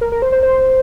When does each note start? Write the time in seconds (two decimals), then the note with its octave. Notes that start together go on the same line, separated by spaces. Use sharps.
0.01 A#4
0.12 A#4
0.22 C5
0.32 C5
0.43 C5